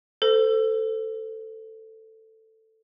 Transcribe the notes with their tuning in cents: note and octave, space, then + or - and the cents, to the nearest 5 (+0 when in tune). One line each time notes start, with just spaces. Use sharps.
A4 +10 C5 -30